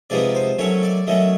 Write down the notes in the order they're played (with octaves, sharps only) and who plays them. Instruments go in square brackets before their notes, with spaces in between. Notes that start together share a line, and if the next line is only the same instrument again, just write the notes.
[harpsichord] C3 F3 G#3 B3 D#4 D5
C5
D#3 F#3 A3 C#4 C#5
D5
D#3 F#3 A3 C#4 D#5